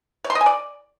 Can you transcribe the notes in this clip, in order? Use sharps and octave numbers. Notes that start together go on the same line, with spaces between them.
C#5
C6
D#5
G#5
D5